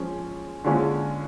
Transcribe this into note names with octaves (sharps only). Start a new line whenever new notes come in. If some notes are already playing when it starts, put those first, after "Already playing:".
Already playing: F3 G#3 C#4
D3 G#3 C#4 F4